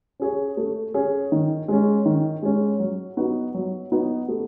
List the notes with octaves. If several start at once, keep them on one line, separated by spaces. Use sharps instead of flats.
C#4 G#4 C#5
A3
C#4 G#4 C#5
D#3
G#3 C#4
D#3
G#3 C#4
F#3
B3 D#4 F#4
F#3
B3 D#4 F#4
A3